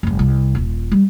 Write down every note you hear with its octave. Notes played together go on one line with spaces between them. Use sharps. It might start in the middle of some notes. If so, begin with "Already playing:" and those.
F1 G2
C2
D#1 F4
G3